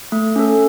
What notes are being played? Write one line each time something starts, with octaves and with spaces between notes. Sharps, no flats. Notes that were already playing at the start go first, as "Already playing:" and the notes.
A3
C#4 A4